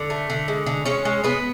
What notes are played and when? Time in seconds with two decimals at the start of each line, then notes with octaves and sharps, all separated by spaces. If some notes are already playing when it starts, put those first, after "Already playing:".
Already playing: D3
0.10 A3
0.30 D3
0.48 G#3
0.66 D3
0.85 G#3 C#4 C#5
1.05 G#3
1.24 G#3 B3 B4